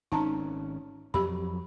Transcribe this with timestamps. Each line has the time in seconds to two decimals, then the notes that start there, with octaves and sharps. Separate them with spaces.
0.12 G#1 C#4 D#4 A5 A#5
1.14 F2 F#3 G4 B5